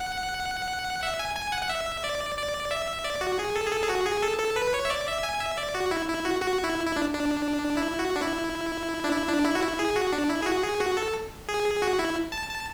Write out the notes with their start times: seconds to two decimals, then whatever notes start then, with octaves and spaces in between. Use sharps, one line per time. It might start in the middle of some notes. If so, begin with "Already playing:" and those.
Already playing: F#5
1.03 E5
1.19 G#5
1.36 G#5
1.52 F#5
1.63 F#5
1.69 E5
2.04 D5
2.37 D5
2.71 E5
3.04 D5
3.21 F#4
3.39 G#4
3.55 A4
3.66 G#4
3.71 A4
3.83 G#4
3.89 F#4
4.06 G#4
4.22 A4
4.39 A4
4.56 B4
4.74 C#5
4.85 E5
4.90 D5
5.07 E5
5.23 G#5
5.40 E5
5.58 D5
5.75 F#4
5.91 E4
6.09 E4
6.25 F#4
6.42 F#4
6.64 E4
6.87 E4
6.96 D4
7.14 D4
7.77 E4
7.99 F#4
8.16 D4
8.22 E4
9.04 D4
9.12 E4
9.28 D4
9.45 E4
9.55 F#4
9.63 E4
9.79 G#4
9.96 F#4
10.13 D4
10.30 E4
10.42 G#4
10.46 F#4
10.63 G#4
10.81 F#4
10.97 A4
11.49 G#4
11.82 F#4
11.99 E4
12.32 A5
12.49 A5